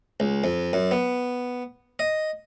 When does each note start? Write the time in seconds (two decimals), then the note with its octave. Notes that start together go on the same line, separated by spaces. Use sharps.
0.20 C#2
0.44 F2
0.73 F#2
0.91 B3
1.99 D#5